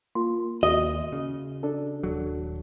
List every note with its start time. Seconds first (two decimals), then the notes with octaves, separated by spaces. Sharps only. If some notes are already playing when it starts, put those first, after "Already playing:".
0.15 A#3 F4 C6
0.63 D#2 F#4 D#5
1.12 C#3
1.63 D4 A4
2.03 D#1 F#3